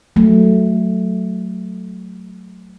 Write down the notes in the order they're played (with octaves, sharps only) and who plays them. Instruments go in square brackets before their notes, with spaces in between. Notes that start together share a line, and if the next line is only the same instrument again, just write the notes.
[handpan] F#3 A3